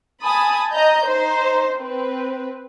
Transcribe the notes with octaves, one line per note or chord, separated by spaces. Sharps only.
G#5 A5 B5 D#6
D#5 A#5 G6
D#4 C5
C4 B4